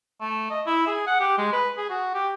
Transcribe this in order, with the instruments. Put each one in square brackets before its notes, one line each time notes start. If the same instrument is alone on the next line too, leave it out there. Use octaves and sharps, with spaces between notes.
[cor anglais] A3
D#5
E4
G#4
F#5
G4
G#3
B4
G#4
F#4
G4